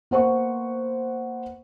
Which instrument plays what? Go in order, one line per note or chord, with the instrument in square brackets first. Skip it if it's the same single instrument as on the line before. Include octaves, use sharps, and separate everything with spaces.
[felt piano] A#3 B3 C5 F#5 C#6